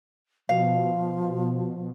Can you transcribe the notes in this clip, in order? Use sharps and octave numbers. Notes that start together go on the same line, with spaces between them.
B2 F3 F5